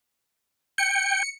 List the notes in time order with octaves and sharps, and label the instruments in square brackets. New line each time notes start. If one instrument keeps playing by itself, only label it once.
[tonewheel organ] G5 [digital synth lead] C#7